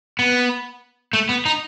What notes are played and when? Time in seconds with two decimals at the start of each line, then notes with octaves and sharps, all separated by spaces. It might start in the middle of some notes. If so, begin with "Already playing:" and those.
0.19 B3
1.13 A3
1.29 B3
1.45 D#4